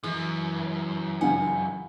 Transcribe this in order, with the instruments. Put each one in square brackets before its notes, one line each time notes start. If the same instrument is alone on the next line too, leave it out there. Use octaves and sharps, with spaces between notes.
[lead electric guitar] F#2 [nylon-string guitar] E3 G#3
[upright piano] C#2 G2 [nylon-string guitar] F#5 [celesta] G#5